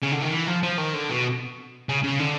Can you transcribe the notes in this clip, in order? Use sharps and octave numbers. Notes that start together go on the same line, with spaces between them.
C#3
D3
D#3
E3
F3
F3
D#3
D3
B2
C#3
C#3
D3